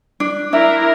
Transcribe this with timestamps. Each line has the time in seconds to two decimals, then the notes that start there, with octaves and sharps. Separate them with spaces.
0.20 D4
0.53 D4 E4 A#4 E5